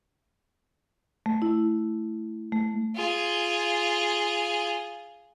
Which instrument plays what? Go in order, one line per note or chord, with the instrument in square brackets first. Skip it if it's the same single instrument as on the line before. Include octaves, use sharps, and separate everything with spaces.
[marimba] A3
E4
A3
[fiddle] F4 G#4